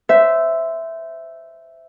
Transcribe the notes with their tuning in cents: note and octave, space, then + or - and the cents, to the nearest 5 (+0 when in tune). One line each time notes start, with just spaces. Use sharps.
C5 -20 E5 +0